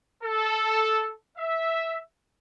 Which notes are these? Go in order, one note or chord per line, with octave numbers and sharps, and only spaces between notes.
A4
E5